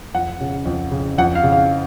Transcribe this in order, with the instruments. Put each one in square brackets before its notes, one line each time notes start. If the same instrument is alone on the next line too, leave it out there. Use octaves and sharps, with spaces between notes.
[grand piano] F2 F#5
C#3
F2
C#3
F2 F#5
F5
C#3
F5